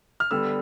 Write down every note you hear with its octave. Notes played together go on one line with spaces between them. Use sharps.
F6
D3 G3 B3 E6